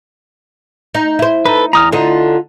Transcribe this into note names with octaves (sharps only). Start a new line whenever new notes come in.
D#4
E4 C5
D#4 A4 B4
E2 A#5 D#6 F6
D3 D#4 F4 D#5